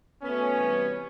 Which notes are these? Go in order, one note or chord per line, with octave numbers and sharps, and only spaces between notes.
B2 F#3 A3 B3 C#4
C3 E3 G3